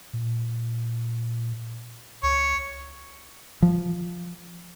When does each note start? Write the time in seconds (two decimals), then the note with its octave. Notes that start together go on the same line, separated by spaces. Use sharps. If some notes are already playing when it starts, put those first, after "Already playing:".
0.13 A#2
2.23 C#2 C#5
3.62 F3